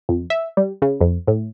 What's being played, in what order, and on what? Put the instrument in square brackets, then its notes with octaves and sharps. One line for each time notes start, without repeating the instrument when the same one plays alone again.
[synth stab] F2
E5
G3
C#3
F2
A2